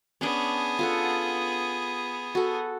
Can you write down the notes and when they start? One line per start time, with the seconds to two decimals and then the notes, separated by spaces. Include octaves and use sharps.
0.21 B3 C#4 D4 G#4
0.79 F4 A4 F#5
2.35 F#4 A4